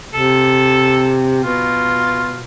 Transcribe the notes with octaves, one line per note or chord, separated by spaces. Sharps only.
C3 A4
B2 F4